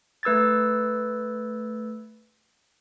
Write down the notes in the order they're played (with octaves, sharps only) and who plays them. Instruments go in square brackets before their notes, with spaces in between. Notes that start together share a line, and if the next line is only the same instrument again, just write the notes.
[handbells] A3 B4 E6 G#6 A6